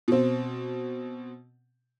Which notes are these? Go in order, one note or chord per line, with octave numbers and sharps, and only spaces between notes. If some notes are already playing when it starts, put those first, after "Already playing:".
B2 C4